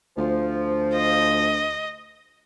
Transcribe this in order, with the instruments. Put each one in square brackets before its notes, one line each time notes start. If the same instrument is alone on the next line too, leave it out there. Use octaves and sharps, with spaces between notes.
[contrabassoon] D2 [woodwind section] F3
[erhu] D#5